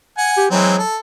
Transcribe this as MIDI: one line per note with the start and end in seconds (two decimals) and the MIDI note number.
0.18 0.46 78
0.18 0.46 80
0.37 0.48 67
0.51 0.77 52
0.51 0.81 54
0.51 0.77 56
0.51 0.77 60
0.79 0.97 69